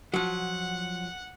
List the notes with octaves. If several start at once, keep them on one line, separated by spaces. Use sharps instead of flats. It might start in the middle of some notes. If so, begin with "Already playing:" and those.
F3 F#3 F#5